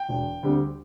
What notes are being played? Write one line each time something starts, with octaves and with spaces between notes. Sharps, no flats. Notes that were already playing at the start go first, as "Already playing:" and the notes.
Already playing: G5
E1
D2 D3 G3 C4